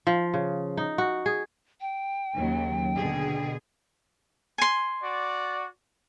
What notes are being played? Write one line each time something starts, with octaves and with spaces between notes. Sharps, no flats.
F3
C#3
D#4
F#4
G#4
G5
D#2 C#3 F#3
B2 D3 G#4
G#5 C6
F#4 D5